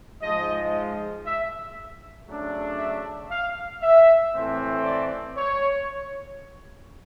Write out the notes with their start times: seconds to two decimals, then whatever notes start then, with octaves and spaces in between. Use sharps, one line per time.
0.21 G#2 F3 G#3 D#5
1.24 E5
2.27 C#3 F#3 A3 D4
2.78 E5
3.30 F5
3.82 E5
4.33 A2 E3 A3 C4
4.84 D5
5.36 C#5